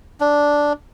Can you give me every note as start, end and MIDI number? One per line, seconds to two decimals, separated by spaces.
0.20 0.73 62